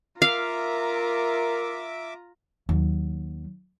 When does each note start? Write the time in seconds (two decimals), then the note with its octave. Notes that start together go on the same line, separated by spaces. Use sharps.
0.22 F4 A#4 E5 F5 A#5 D6
2.69 D#2 F#3